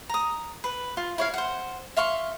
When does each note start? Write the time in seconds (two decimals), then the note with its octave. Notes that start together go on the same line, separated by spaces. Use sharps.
0.09 A#5 D#6
0.64 B4
0.97 F4
1.18 E4 C#5 F5
1.34 C5 F#5
1.96 E5 F5 C6 C#6